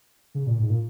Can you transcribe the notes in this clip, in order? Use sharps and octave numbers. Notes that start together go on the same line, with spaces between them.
C#3
A#2
G#2
A#2